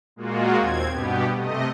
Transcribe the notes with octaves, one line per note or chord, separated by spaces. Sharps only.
A#2 G#3 A#3 F4 F#4
D#2 C4 G#6
G2 B2 B3 G4
C3 A3 D#5